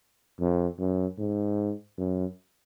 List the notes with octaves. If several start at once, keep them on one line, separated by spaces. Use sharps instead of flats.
F2
F#2
G#2
F#2